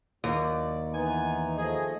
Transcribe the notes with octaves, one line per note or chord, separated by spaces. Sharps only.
D#2 F#3 D5
E3 B3 D#4 G#5
F3 A3 G#4 D#5